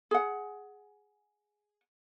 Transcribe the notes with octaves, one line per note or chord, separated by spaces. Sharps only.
G#4 F#5